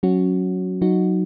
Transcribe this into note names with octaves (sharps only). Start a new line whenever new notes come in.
F#3 C#4 F#4
F#3 D#4 F#4